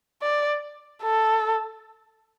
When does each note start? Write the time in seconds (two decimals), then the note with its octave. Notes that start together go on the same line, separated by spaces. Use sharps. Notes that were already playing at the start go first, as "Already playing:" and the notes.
0.22 D5
1.03 A4